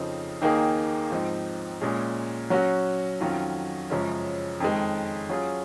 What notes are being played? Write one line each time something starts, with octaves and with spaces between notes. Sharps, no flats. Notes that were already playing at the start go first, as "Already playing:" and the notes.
Already playing: F2 C#3 F3 C4 D#4
D#2 D#3 A#3 D#4 G#4
G#2 F3 C4 D#4
A#2 G#3 C#4 G#4
F#3 C#4 F#4
F2 D#3 F#3 C#4 F4
F#2 C#3 F3 G#3 C#4
F2 D#3 G#3
F#3 C#4 F4 G#4